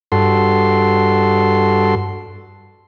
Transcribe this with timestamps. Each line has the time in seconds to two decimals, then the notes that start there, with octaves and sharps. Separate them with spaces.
0.12 G2 F#4 A4 C6